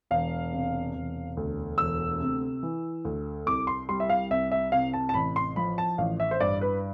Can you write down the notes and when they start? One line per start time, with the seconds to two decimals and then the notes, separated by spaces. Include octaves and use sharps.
0.11 E1 F5
0.53 C3
0.95 E1
1.37 D2
1.78 E1 E6
2.21 C3
2.63 E3
3.05 D2
3.46 C2 D6
3.67 C6
3.89 G3 C6
4.00 E5
4.09 F5
4.31 C2 E5
4.52 E5
4.72 C3 F5
4.94 A5
5.09 A5
5.14 A1 B5
5.36 C6
5.56 F3 B5
5.78 A5
5.98 A1 F5
6.20 E5
6.31 C5
6.40 G2 D5
6.61 B4